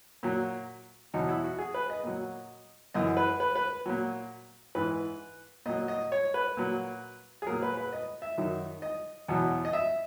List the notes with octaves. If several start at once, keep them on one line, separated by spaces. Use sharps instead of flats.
A#2 F#3
E2 B2 F#3 D#4
E4
F#4
G#4
B4
D#5
A#2 F#3
F#2 E3 D#5
B4
B4
B4
A#2 F#3
G#2 E3 B4
A#2 F#3 D#5
D#5
C#5
B4
A#2 F#3
G#4
A#2 F#3 A#4
B4
B4
D#5
E5
F#2 D#3 F#3
D#5
E2 B2 F#3
D#5
E5